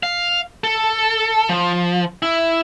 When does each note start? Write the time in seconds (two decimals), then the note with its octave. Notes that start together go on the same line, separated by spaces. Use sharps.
0.03 F5
0.64 A4
1.49 F3
2.22 E4